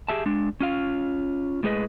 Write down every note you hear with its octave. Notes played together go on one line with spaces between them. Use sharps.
G4 G#4 E5 A5
G#3 D4
C#4 F4 F5
A2 G#3 G#4 B4 D#5